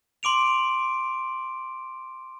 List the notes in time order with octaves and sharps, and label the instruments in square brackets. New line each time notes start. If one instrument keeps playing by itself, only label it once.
[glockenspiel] C6 D6 D7 F7